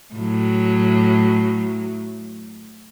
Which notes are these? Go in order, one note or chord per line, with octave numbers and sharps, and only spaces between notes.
A2 F#3